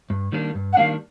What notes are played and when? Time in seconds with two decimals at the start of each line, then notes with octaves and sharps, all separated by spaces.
0.10 G2
0.32 D#3 G3 A#3 D4
0.55 G2
0.73 F#5
0.77 D#3 G3 A#3 D4 F5